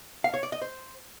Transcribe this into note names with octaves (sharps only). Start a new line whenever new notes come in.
F5
C#5
D5
D#5
C5